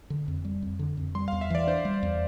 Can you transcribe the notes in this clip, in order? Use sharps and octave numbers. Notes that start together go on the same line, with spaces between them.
D3
F2
G3
F2
D3
F2
G3 C6
F5
E2
E5
E3 D5
D4 C5
G3
E2